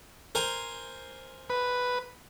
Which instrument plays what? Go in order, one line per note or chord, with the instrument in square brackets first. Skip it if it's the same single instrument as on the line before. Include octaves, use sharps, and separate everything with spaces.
[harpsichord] A#4 C5 G#5
[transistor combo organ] B4